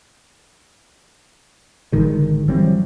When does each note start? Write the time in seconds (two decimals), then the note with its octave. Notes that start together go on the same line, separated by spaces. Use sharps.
1.92 G#1 D3 D#3 G#3
2.48 E3 F#3 G3 C4